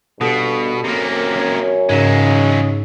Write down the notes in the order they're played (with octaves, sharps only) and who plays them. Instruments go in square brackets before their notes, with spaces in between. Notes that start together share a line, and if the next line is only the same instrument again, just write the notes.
[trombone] G2 [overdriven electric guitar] B2 [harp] F#4 A4 D#6
[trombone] F#2 [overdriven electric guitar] C3 A#3
[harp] C#4 C#5
[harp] G#2 B6 E7 [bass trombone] C#3 [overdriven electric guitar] F#3 G#3